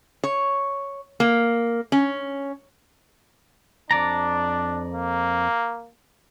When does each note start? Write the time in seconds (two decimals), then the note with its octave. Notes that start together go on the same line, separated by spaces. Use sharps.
0.24 C#5
1.20 A#3
1.92 C#4
3.91 F2 D4 D5 A#5
4.94 A#3